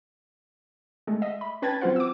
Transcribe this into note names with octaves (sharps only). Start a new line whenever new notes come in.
G#3 A3
D#5 E5
B5
C#4 B4 G5 A5 G#6 A6
F#3 C4 F4 C5 F#5
D6 E6